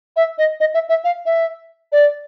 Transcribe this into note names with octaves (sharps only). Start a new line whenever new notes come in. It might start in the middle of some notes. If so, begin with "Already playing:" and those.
E5
D#5
D#5
E5
E5
F5
E5
D5